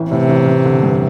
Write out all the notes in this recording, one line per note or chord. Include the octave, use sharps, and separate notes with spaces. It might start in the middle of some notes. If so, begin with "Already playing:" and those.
Already playing: A1 E3
A2 C3
A1
A1
D3
G2